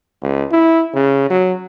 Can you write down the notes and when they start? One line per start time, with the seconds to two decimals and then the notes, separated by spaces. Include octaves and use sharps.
0.22 C#2
0.52 E4
0.94 C#3
1.30 F#3